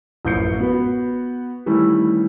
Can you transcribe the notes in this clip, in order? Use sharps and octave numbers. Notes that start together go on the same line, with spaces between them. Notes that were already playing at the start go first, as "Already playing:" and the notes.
A1 F#2 F3 G6 C7 C#7
B3 F#4 B4
D#3 E3 G3 A3 C#4 E4